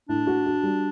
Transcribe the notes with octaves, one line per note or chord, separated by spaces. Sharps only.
A2 D4
F#4
F#4
G3